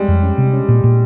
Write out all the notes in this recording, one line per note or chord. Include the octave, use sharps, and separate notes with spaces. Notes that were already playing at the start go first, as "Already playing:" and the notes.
Already playing: G3 G#3
F2
C#4
C3
C#4
A#2
A#2